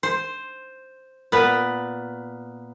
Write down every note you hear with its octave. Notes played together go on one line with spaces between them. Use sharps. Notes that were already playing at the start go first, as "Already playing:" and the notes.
C5
A#2 B3 B4